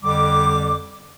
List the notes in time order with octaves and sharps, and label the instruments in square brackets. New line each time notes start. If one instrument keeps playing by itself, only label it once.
[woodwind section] F2 D3 G3 D6